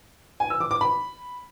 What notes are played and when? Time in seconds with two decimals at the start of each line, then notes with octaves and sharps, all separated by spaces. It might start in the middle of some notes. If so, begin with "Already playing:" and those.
0.40 G#5
0.50 E6
0.61 D6
0.71 D6
0.81 B5